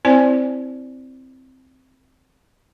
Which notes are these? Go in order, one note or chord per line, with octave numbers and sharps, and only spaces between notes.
C4 E4 C5 D5 G#5